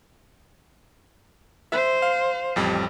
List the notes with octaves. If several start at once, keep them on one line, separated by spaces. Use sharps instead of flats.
C5 E5
F5
A1 F2 G3